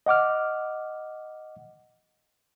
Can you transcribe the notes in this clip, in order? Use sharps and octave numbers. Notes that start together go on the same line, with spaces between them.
D#5 F#5 D6 F6